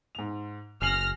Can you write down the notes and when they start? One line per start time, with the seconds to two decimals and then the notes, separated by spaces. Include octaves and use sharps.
0.15 G#2 F7
0.82 F#1 G#5 F6 A#6 C7 F#7